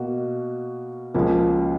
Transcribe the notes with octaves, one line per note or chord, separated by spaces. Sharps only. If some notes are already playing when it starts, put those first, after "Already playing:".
Already playing: B2 A#3 F#4
C#2 C#3 F3 A#3